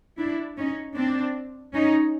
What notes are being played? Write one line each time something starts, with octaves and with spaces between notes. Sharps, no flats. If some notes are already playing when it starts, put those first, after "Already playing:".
D4 E4
C#4 D#4
C4 D4
C#4 D#4